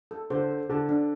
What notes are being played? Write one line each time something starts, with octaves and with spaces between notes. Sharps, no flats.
A4
D3 C5
A4
D3 A5
D4